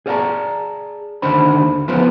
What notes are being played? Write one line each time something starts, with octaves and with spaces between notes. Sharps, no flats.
G#4 C5 D5 F5 A5 A#5
D#2 D3 D#4 C5 B5
F3 B3 F4 G#4 B4 C5